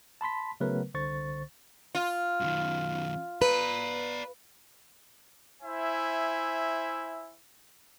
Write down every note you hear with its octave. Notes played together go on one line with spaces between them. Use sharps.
A5 B5 C6 B6
C#3 F#3 A3 B3 A#4 B4
C2 D3 C5 C#6 A6
F4
F#2 D#3
B4 D5 A#5
E4 C5 E5 G#5